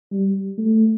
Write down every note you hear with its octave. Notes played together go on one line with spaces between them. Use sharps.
G3
A3